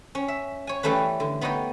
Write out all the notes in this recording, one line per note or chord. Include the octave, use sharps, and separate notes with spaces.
C#4
E5
C#5 G#5
E3 G3 A3 C#4 B4
D3
B3 D#4 C#5 D#5 G5